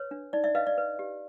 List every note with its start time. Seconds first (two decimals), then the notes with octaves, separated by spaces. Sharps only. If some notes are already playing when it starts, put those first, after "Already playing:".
Already playing: B4 C#5
0.11 D4
0.33 D#4 D5
0.44 D5 E5
0.55 B4 D#5 F5
0.67 D5
0.78 B4
0.99 G4